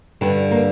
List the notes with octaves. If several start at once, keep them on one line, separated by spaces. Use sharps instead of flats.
G2 D3 G3
A#3